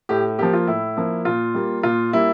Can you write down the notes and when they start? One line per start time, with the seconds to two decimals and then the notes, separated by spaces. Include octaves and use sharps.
0.09 A2 G4
0.39 F3 A#3 G4
0.53 F4
0.67 A2 E4
0.97 F3 A#3
1.25 A#2 F4
1.54 G3 A#3
1.83 A#2 F4
2.13 G3 A#3 E4